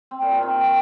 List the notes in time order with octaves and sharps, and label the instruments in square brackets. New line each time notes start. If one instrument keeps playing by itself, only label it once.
[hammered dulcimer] C4
A#2
C3
D#3